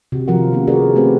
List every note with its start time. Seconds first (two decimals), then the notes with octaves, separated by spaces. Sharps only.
0.12 C3 F#4
0.28 D#3 F3 F4 F#4 A#4 F#5
0.52 F3 A#3 B3 C#4
0.67 F#4 G#4 A#4 B4 D5
0.95 A3 C4 G4 B4